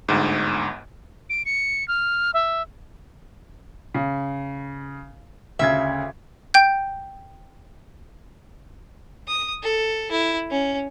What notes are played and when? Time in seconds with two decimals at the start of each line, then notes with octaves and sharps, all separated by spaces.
0.08 G1 D2 G#2
1.30 D7
1.45 C#7
1.88 F6
2.34 E5
3.94 C#3
5.59 D2 C#3 E5 G#6
6.54 G5 G6
9.28 D#6
9.63 A4
10.11 E4
10.51 C#4